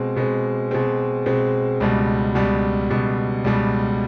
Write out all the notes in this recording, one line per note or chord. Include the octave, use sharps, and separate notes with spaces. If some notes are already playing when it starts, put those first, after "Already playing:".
Already playing: B2 G#3 C4
B2 G#3 C4
B2 G#3 C4
B2 G#3 C4
C#2 B2 G3
C#2 B2 G3
C#2 B2 G3
C#2 B2 G3